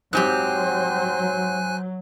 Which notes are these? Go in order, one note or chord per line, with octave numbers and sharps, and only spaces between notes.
G#2 F#3 C4 G4 C5 G#5 F#6